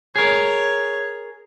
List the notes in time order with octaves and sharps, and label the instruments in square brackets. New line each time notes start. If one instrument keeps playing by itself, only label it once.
[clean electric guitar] G#4 A#4 [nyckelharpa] C#5